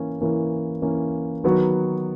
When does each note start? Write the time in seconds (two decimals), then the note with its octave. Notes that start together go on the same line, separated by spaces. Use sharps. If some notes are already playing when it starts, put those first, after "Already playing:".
Already playing: E3 A#3 C#4
0.21 E3 A#3 C#4
0.82 E3 A#3 C#4
1.44 D#3 F#3 B3 F#4